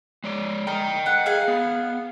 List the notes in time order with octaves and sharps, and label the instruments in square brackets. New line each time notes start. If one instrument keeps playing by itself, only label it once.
[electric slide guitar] G#3 C#5 D5
[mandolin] A#4 [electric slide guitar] D#5 G5
[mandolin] F#5
G#4 F5
[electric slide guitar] B3